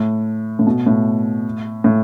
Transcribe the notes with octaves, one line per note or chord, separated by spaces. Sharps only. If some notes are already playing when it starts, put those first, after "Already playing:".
Already playing: A2
A2
B2
A2
A2